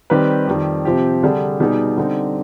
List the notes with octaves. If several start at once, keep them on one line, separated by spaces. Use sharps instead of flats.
D#3 G3 C4 G4 B4
F2 D#3 G3
C3 F3 C4 G4
D3 G3 D4 G#4
B2 G3 B3 D#4 G#4
D3 G3 C4 D#4